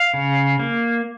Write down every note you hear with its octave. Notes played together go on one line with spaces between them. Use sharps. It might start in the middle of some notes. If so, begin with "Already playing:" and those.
Already playing: F5
C#3
A#3